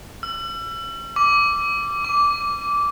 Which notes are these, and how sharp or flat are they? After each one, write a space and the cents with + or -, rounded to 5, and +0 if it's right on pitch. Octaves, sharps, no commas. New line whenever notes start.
E6 +40
D6 -10
D6 -15